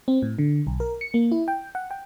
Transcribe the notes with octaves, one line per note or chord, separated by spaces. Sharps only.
C4
A2
D3
B1
A#4
C#7
A#3
E4
G5
F#5
G5